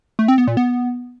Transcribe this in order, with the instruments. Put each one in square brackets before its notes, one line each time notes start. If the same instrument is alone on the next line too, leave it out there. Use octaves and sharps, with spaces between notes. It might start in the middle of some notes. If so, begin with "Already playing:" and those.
[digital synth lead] A3
C4
B3
A#2
B3